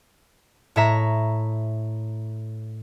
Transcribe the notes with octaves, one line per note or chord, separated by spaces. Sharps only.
A2 C#5 E5 A#5